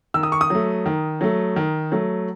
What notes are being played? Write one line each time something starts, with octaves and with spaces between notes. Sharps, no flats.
D#3 E6
D#6
C#6
D#6
F#3 A3
D#3
F#3 A3
D#3
F#3 A3